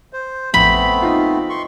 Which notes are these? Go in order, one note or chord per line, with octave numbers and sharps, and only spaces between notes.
C5
A1 F2 A3 B3 C4 B5
D#4 F4
C6 C#6